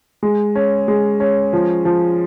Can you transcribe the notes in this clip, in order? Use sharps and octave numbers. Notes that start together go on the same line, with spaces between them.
G#3
C#4
G#3
C#4
F3
F3